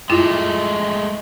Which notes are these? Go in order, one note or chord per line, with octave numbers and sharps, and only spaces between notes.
F#2 G#3 A3 E4 F4